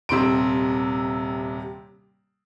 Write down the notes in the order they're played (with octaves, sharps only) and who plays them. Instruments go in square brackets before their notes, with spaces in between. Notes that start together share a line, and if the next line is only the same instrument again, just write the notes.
[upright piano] D#1 C3 C6 D7